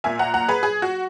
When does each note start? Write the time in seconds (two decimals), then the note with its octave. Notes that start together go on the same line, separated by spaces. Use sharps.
0.04 A#2 A#3 E5 G#5
0.19 F#5 A#5
0.34 F#5 A#5
0.48 G#4 B4
0.63 G#4
0.82 F#4